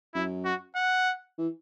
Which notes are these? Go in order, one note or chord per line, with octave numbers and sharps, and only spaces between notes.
F#2 E4
F#4
F#5
E3